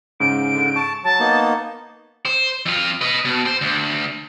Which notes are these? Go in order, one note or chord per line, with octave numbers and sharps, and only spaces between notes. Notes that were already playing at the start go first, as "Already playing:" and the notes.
G#2 C#3 D7
D3
A5 C#6
F#3 A5
A#3 B3 D#4
C5
F2 F4
B4 D#5
B2
C5
D2